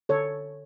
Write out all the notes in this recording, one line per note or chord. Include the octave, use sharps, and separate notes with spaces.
D3 A4 C#5